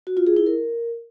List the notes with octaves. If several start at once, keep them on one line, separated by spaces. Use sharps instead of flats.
F#4
F4
G#4
E4
A#4